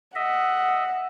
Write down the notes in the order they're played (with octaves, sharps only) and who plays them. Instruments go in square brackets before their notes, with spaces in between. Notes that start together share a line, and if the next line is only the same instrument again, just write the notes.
[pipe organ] D#5 E5 [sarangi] F#5